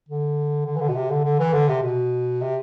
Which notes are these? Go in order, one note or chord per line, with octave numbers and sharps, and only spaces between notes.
D3
D3
E3
D3
B2
C3
D3
D3
E3
D3
C3
B2
C3